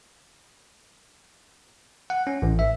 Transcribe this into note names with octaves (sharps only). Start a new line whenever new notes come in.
F#5
C#4
A1
E5